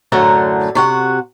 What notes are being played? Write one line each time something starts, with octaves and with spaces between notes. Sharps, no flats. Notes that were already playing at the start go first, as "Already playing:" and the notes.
F#2 A2 D3 A3 F#5 A#5
C3 F#4 F#5